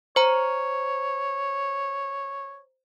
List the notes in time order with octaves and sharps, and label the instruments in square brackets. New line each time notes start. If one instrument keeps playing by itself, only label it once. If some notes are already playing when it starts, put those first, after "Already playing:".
[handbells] C5 A#5 [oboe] C#5